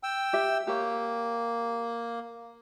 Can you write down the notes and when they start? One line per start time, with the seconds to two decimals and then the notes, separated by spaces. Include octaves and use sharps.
0.03 G5 E6
0.33 G4 E5
0.67 A#3 G4 C#5